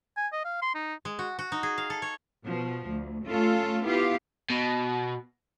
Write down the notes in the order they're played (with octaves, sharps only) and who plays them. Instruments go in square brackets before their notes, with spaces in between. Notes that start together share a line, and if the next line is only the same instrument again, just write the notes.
[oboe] G#5
D#5
F5
C6
D#4
[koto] G#3
F#4
F#4
D#4
G#4
F5
A4
C#5
[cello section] B2 F3
D2
A3 C#4 F4 A4
B3 E4 F4 G4 F5
[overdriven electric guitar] B2